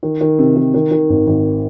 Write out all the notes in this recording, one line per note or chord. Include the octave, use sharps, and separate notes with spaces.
D#3
D#3
C3
D#3
D#3
D#3
G#1
G#1